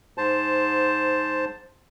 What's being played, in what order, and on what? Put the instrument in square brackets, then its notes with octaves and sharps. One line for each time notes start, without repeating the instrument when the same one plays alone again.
[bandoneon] G#2 C5 A5